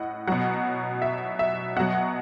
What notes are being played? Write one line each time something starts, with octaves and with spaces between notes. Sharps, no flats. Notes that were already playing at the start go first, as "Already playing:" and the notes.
Already playing: A2 D#5 F#5
B2 F#3 F#5
E5
E5
B2 F#3 F#5